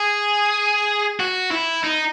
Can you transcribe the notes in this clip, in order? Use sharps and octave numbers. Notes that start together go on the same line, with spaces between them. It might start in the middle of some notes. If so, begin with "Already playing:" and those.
Already playing: G#4
F#4
E4
D#4